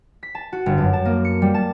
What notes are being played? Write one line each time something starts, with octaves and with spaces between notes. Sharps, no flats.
B6
A5
F#4
G1
F#2
A5
A#3
C#7
G3
A5